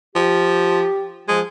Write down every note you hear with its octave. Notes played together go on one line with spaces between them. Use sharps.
F3 G4
F3 G#3